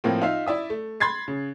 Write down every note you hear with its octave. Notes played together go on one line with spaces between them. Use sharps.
A2 F3 A#3 C4
D#4 F4 E5 F5
E4 D5 E5 D#6
A3
B5 C6 G#6 A6 C7
C#3